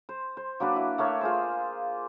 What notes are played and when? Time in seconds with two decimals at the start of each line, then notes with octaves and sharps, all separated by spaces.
0.09 C5
0.37 C5
0.60 F#3 A#3 D4 B4
0.76 E4
0.98 A3 A#3 C#5 F5
1.21 F4 G#4 C5